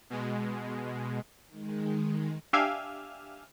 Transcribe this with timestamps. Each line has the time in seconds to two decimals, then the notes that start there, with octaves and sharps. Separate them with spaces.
0.10 B2 G#3
1.47 D#3 G#3
2.53 D4 G4 E5 F5 G#5